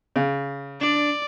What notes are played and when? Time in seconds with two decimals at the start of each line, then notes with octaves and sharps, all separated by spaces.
0.16 C#3
0.81 D4 D5